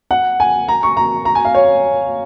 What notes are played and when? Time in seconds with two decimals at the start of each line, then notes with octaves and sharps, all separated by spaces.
0.11 F#5
0.40 G#5
0.68 A#5
0.83 C#6
0.97 A#5
1.25 A#5
1.35 G#5
1.45 F5
1.54 C#5